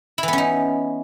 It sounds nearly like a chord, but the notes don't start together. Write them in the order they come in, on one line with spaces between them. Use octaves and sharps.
E4 E3 B3 C#4 D#4